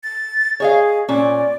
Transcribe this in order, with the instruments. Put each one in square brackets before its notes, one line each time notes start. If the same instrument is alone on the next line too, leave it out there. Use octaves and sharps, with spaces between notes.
[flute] A6
[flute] G#4 [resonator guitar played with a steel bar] C#5 D#5 F5
[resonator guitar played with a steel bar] A#2 C#4 [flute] D5